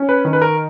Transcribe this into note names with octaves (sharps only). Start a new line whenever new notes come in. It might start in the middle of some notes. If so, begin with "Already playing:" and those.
Already playing: C#4
B4
D#3
B4
A#4